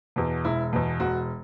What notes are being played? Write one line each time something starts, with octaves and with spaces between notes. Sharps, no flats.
E2 B2
E1 E4
E2 B2
E1 F#4